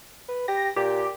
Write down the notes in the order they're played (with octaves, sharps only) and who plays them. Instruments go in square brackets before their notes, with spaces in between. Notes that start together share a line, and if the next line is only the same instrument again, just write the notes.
[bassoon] B4
[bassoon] G4 [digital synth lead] A#6
[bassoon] A#2 [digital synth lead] G4